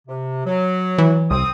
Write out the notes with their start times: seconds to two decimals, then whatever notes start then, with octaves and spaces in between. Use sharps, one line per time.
0.07 C3
0.46 F#3
0.98 E3
1.31 C2 C4 D#6